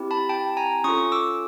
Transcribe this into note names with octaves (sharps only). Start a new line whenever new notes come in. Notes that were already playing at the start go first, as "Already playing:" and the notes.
Already playing: C4 E4 G4
A5 B5
G5 A5
G#5 A#5
C#4 F4 A4 C#6 D#6
D6 E6